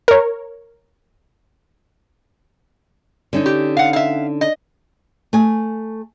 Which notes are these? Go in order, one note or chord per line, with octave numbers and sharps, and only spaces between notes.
A#4 C#5
D3 C#4 D#4
G4
F5 F#5
E5 F5
D#5
A3 G#5